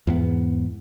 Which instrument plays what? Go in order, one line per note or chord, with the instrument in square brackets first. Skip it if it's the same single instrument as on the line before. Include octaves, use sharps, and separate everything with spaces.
[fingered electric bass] E2 G#2 B3